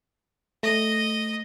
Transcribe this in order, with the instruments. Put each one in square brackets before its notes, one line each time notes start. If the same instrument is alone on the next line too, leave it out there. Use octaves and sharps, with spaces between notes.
[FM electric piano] A3 A#6 [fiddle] D#5